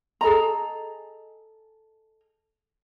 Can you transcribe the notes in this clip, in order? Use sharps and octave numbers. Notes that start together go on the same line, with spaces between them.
G#4 A4 D#5 A#5